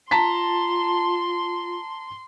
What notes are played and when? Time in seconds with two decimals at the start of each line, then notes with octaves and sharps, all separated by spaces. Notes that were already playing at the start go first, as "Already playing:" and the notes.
0.11 F4 A5 A#5 C6 B6